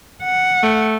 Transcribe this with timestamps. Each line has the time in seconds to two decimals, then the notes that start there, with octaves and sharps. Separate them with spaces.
0.23 F#5
0.63 A3